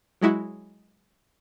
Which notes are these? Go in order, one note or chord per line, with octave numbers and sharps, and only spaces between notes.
F#3 G#3 E4 F#4